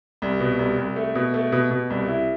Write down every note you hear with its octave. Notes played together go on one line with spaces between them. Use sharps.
C2
B2
C2
C2
A3
B2
A3
B2
B2
C2
E4